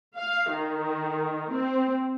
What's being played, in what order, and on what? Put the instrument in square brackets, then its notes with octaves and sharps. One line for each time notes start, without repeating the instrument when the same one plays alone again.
[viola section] F5
D#3
C4